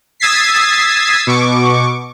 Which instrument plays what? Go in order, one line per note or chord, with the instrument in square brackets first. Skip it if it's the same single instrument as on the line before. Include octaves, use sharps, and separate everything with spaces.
[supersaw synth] D#6 E6 G#6 A6 B6 C7
B2 C#6 D6